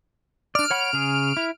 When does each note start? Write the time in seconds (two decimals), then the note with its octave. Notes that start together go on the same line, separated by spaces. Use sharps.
0.55 D4 D5 F6 D7
0.70 C#5 F#5 B5
0.93 C#3 G#4
1.37 E4